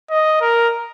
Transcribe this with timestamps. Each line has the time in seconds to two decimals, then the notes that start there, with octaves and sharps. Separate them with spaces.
0.10 D#5
0.41 A#4